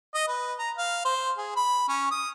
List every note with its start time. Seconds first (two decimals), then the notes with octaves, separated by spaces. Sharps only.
0.14 D#5
0.28 B4
0.59 A#5
0.77 F5
1.05 C5
1.38 G#4
1.56 B5
1.88 C#4
2.11 D#6